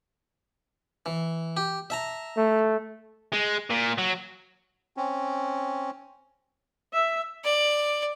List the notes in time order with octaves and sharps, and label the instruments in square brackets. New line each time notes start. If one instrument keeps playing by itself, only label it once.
[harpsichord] E3
G4
E5 A5 A#5
[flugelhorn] A3
[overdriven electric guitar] G#3
A#2
F#3
[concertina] C4 C#4
[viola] E5
[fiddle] D5